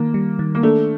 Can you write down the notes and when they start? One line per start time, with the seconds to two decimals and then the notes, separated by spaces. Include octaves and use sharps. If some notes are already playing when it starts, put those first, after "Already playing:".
Already playing: D#3 A#3
0.14 G3
0.39 D#3
0.55 A#3
0.63 A3 D4